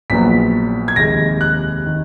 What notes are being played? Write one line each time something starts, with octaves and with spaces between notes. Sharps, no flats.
A#1 A#2 F#3 B3 B6
G#6
F1 D#2 D#3 G#3 A#6
F#6
D#3